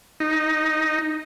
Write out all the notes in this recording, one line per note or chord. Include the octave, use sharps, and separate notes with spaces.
D#4